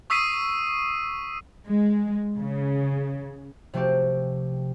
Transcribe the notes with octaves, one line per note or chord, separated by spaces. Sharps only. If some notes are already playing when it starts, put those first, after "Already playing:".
C#6 D#6 E6 B6 C7 D#7
G#3
C#3
C3 F3 A3 C4 F#4 G4